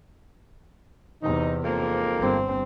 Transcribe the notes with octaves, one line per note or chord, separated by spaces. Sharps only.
E2 C3 D#4
F2 G#2 A#3
G1 C4